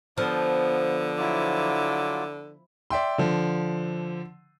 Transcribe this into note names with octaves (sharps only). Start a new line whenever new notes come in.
D3 F3 B3
F#3 E4 F4 D6
D5 E5 G5 C6
D3 F3